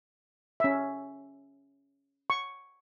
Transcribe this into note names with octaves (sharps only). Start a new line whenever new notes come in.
C#4 E5
C#6